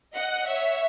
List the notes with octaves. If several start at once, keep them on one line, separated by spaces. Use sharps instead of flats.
D#5 F#5
C#5 E5